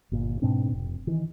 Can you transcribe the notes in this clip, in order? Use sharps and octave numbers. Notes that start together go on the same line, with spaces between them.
G1 A#2
G#2 B2 C4 D4
F1
D#3 E3